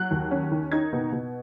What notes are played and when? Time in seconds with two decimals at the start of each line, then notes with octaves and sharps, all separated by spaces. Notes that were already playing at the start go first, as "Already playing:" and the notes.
Already playing: F#3 F#6
0.11 D#2
0.31 C#4
0.51 D#3
0.72 D#4 G#6
0.93 B2
1.12 B2